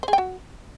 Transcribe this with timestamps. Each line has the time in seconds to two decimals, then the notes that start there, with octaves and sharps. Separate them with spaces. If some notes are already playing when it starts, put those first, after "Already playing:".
0.03 C5
0.08 G#4
0.13 G5
0.18 F#4